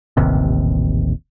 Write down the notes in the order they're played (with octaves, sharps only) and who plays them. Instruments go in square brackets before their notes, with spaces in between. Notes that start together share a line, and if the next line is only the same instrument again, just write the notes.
[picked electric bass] D#1 A1 D#2 C3